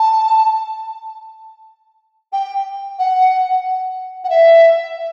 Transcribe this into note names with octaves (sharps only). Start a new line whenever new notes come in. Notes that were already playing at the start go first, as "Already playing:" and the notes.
Already playing: A5
G5
F#5
F#5
E5